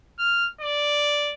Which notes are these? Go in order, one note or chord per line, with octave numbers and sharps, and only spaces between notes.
F6
D5